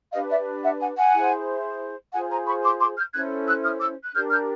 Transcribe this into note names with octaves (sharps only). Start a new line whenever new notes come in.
D4 G4 B4 D#5 F5
D5 E5
E5 F#5
F#5 G#5
F#5 G#5
E4 G#4 C5
F4 G#4 C5 F#5 G#5
G#5 A#5
B5 C#6
C6 D6
C6 D6
F6 G6
C#4 E4 A4 C5 F#6 G#6
E6 F#6
D#6 F6
D6 E6
F#6
D4 G4 A#4 F6 G6
F6 G6